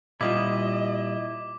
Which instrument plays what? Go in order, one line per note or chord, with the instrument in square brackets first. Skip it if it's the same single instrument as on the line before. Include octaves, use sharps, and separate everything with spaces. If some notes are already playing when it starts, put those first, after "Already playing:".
[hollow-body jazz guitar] A#2 G3 F4 [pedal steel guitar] E4 D#6 [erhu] D#5 [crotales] D6